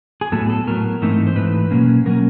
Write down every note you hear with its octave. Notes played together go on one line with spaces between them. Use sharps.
G#4
A2 F#3 B3 A4
A4
A2 F#3 B3 A#4
G#2 E3 A3 C4 D#4
C5
G#2 E3 A3 D#4 B4
B2 F#3 A#3 C#4
B2 F#3 A#3 C#4 A#4